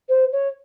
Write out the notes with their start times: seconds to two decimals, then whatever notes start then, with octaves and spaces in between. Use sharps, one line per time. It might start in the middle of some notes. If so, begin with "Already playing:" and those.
0.09 C5
0.32 C#5